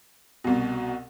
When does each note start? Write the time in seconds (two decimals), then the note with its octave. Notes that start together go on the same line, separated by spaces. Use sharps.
0.44 C2 B2